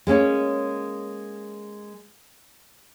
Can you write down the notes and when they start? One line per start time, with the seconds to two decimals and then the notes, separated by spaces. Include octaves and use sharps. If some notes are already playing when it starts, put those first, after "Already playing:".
0.07 G#3 A#3 C#4 C#5